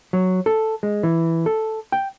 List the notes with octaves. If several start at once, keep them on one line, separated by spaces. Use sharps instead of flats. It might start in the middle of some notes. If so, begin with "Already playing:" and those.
F#3
A4
G#3
E3
A4
G5